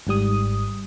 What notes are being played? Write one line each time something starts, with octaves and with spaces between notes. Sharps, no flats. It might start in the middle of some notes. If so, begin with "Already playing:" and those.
G#1 G#2 G3 D#6